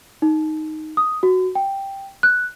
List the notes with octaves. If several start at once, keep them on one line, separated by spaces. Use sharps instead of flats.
D#4
D#6
F#4
G5
F#6